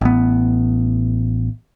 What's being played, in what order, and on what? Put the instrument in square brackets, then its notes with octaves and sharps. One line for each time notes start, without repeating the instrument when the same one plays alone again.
[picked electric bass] A1 B3